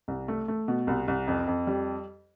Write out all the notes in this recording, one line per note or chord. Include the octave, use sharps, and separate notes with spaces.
C2
A3
A3
B2
C2
C2
F2
F2
G3